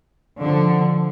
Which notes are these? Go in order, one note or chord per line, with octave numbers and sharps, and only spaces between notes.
D3 F3